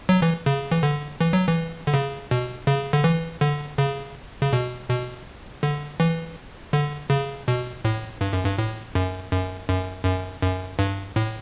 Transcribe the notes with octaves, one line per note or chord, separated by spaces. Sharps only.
F#3
E3
C#3
E3
D3
E3
F#3
E3
D3
C#3
B2
C#3
D3
E3
D3
C#3
C#3
B2
B2
D3
E3
D3
C#3
B2
A2
G2
F#2
G2
A2
F#2
F#2
F#2
F#2
F#2
G2
A2